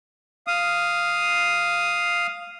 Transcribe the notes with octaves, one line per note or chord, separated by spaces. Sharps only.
F5 D#6